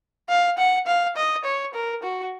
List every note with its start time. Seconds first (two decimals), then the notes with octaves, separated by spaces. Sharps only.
0.29 F5
0.58 F#5
0.87 F5
1.16 D#5
1.45 C#5
1.74 A#4
2.03 F#4